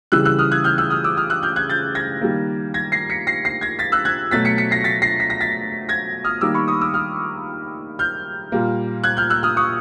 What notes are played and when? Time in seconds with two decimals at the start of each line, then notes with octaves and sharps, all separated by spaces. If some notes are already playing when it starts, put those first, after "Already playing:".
0.12 C#3 E3 G3 E6 F#6
0.25 E6 F#6
0.39 D#6 F6
0.52 F#6 G#6
0.64 F6 G6
0.78 E6 F#6
0.90 D#6 F6
1.04 D6 E6
1.17 D#6 F6
1.30 E6 F#6
1.43 F6 G6
1.56 F#6 G#6
1.70 G6 A6
1.95 G#6 A#6
2.21 D#3 G3 A#3
2.74 G#6 A#6
2.92 A#6 C7
3.10 B6 C#7
3.27 A#6 C7
3.45 A#6 C7
3.61 G#6 A#6
3.79 A6 B6
3.92 E6 F#6
4.05 F#6 G#6
4.31 B2 F#3 A3 A6 B6
4.45 B6 C#7
4.58 B6 C#7
4.71 A#6 C7
4.84 A6 B6
5.02 A#6 C7
5.20 B6
5.30 A#6
5.41 A6 B6
5.89 G#6 A#6
6.24 D#6 F6
6.41 D#3 G3 A#3 D6 E6
6.54 B5 C#6
6.68 C#6 D#6
6.81 D6 E6
6.94 D#6 F6
7.99 F6 G6
8.52 A#2 G3 A#3
9.04 F#6 G#6
9.17 F6 G6
9.30 E6 F#6
9.43 D#6 F6
9.57 C#6 D#6